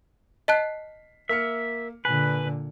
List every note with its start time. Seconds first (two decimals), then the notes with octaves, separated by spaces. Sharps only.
0.48 D#5 A5 F#6 B6 C7
1.29 A#3 E5 F6 C#7
2.05 A#2 D3 B4 G#5